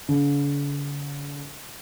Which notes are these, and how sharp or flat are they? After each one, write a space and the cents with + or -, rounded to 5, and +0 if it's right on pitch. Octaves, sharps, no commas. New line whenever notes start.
D3 -45